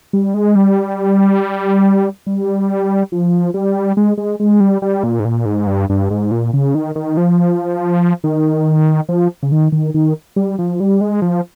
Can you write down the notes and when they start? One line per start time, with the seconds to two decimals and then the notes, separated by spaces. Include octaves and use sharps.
0.13 G3
0.34 G#3
0.55 G3
2.26 G3
3.12 F3
3.54 G3
3.97 G#3
4.18 G#3
4.40 G#3
4.60 G3
4.82 G3
5.03 A#2
5.20 G#2
5.25 A#2
5.46 G#2
5.67 G2
5.89 G2
6.10 G#2
6.31 A#2
6.53 C#3
6.75 D#3
6.95 D#3
7.17 F3
8.24 D#3
9.09 F3
9.43 C#3
9.52 D#3
9.72 D#3
9.94 D#3
10.36 G3
10.59 F3
10.80 G3
11.01 G#3
11.22 F3